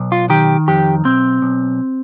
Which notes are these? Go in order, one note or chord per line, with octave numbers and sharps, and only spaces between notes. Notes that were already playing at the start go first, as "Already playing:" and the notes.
Already playing: B1
F4
D#3 G4
F2 G4
B1 C4
B1